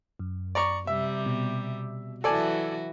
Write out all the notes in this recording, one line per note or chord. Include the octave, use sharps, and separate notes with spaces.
F#2
D5 A#5 C#6
C3 G3 E5
B2
E3 F#3 F#4 A4 D5 G#5